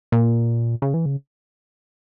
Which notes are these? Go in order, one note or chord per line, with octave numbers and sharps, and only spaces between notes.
A#2
C#3
E3
C#3